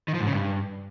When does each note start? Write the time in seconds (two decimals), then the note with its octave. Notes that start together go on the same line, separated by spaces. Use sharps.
0.08 D#3
0.14 F3
0.20 G#2
0.27 C#3
0.33 G2